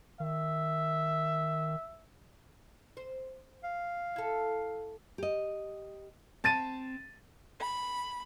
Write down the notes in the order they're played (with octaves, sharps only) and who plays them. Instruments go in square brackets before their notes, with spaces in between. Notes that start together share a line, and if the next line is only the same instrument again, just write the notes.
[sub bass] D#3 [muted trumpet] E5
[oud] C5
[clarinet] F5
[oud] E4 A4
[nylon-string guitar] G4 D#5
[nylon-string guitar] C4 [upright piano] A5 A6 D#7
[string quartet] B5